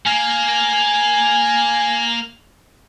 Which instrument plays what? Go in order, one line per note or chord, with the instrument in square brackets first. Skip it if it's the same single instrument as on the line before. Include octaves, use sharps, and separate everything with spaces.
[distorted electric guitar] A#3 [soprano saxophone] G#5